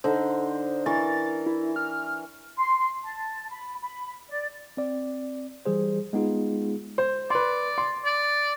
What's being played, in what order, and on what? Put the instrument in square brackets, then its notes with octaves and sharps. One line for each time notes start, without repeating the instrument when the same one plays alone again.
[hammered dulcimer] D3 D#4 [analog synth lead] C5
[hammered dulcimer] E3 A#4 C#6 [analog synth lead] A6
[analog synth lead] E4
F6
[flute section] C6
A5
B5
B5
D5
[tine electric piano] C4 D5
E3 G3 G#4 C5
G#3 B3 D#4 F4 G#4
[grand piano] C5
[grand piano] B4 C6 [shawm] D5
[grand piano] C6
[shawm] D5